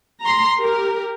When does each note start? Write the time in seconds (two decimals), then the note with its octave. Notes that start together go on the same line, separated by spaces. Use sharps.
0.22 A#5 C6
0.59 G4 A#4